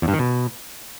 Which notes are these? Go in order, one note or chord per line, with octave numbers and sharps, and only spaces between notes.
E2
G2
D#3
B2